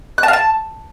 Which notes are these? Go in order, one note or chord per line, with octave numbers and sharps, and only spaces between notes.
F#6
A5
F5
A5